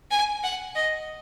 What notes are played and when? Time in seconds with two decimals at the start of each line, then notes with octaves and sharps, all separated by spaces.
0.11 G#5
0.44 F#5
0.75 D#5